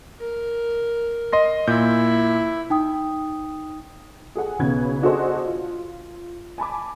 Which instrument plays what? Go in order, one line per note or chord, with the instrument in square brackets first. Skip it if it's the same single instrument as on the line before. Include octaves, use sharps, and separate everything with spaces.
[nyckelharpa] A#4
[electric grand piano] D#5 C6 A#6
[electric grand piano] A#2 G6 [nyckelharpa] E4
[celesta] D#4 G5 D#6
[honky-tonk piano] G#4 A4 F#5 G#5
B1 C#3 B3 C#4 B4 G#6
D4 F#4 G#4 A4 C5 D#5
F4
G#5 A5 B5 D6